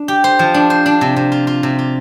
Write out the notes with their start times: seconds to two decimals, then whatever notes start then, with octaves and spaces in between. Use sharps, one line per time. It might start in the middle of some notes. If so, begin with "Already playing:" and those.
Already playing: D4
0.08 G4
0.24 C5
0.39 F3
0.54 D4
0.70 C5
0.86 D4
1.01 C3
1.16 C3
1.32 F4
1.47 F4
1.63 C3
1.79 F4